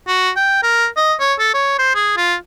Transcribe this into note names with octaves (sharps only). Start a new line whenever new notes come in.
F#4
G5
A#4
D#5
C#5
A4
C#5
C5
G#4
F4